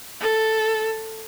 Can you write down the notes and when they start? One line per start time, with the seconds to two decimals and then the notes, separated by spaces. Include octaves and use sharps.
0.21 A4